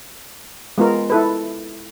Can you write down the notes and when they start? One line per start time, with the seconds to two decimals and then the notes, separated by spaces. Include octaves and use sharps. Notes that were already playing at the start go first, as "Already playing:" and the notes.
0.78 G#3 B3 F4 A#4
1.10 E4 A4 B4